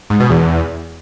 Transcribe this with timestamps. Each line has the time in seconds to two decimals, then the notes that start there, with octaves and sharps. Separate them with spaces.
0.10 G#2
0.20 B2
0.30 E2